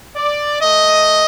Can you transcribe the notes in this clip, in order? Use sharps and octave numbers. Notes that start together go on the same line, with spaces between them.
D5
A3 D#5